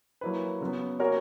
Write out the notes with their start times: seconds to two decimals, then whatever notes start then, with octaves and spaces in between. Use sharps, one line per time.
0.21 F#3 A#3 E4 B4
0.61 C#3 F#3 B3
1.00 A#3 C#4 F#4 A#4 C#5